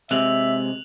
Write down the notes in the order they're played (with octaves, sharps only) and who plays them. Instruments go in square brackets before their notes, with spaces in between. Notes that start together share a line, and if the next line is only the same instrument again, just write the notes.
[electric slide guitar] C3 G#3 [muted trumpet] E5 [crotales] F#6 F7 F#7